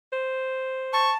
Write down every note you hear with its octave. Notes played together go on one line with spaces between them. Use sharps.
C5
A5 C#6